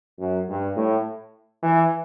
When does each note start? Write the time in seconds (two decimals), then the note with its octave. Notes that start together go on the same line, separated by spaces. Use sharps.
0.19 F#2
0.49 G2
0.76 A2
1.63 E3